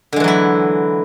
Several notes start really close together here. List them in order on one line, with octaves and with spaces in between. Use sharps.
D3 G#3 E3 F#3 E4